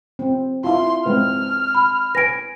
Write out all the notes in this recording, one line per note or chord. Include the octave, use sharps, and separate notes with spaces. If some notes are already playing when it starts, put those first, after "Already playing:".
C4
E4 F4 C6
G#3 C4 B4 F6
B5
B4 G#5 A#6 D7